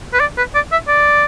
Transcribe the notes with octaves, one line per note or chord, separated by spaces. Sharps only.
B4
D5
B4
D5
E5
D5